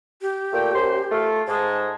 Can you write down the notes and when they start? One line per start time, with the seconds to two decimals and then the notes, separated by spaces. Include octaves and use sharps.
0.22 G4
0.53 A#2 A3 G5
0.74 F#2 C5 C6
1.11 A3 F4
1.47 G#2 G#3 A5